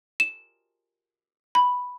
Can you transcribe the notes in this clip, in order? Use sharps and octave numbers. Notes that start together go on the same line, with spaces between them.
E7
B5